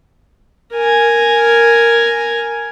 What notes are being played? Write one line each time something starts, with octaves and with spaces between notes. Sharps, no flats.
A#4 G#5